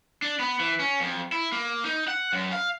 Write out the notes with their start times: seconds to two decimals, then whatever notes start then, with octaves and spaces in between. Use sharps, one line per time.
0.22 D4
0.39 B3
0.60 E3
0.80 C#4
1.01 F2
1.32 E4
1.52 A#3
1.85 D#4
2.08 F#5
2.33 F#2
2.52 F5